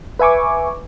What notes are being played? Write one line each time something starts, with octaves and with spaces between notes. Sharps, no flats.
B4 E5 G#5 C#6 D6